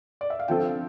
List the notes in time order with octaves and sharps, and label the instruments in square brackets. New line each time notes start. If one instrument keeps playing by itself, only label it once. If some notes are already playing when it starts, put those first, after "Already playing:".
[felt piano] D5
E5
F5
[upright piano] D3 F3 C4 F4 A4 [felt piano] G5